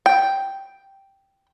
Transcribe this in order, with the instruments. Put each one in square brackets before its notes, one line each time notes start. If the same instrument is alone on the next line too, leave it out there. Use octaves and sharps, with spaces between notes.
[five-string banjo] G5